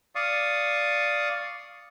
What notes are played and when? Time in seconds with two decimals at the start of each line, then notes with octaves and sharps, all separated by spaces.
0.15 D5 F5 C#6 D#6